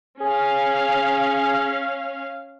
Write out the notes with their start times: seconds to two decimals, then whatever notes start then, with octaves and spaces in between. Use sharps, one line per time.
0.21 C#4 G#4 F5